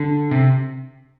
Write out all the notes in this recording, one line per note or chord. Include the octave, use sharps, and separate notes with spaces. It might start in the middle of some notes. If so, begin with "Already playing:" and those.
Already playing: D3
C3